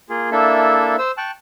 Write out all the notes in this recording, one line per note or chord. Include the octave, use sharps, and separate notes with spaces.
A#3 F4 G#4
A#3 D4 E4 A4 E5
C5 E6
G5 A5 C#6 F#6